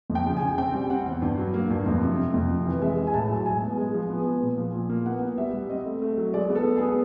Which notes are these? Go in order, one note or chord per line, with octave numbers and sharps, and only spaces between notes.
F2
G5
C#3
C#3 G#5
C4 G5
G3
C4 F#5
E2
G2
F#3
A#3
G2
F2
C3
C3
F2
C3
E3
G#3 E5
G#3
G#5
A2 A5
F#3
A2 G#5
B3
G#3
F3
B3
B3
A#2
F3
A#2
A#3
B3 F#5
B3
G3 E5
G3
C4 D#5
A3
A3
F#3
G#3 D5
B3
A4
B3
B3 G#4